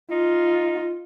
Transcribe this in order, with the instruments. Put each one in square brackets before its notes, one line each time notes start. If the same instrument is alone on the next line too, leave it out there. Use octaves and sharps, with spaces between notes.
[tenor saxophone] D#4 [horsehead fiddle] F4